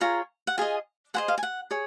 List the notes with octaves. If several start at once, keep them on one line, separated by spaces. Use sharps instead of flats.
F4 G#4 C#5 A#5
F#5
F4 G#4 D#5 G#5
G#4 C5 D#5 F#5
F5
G#5
F#5
G#4 C#5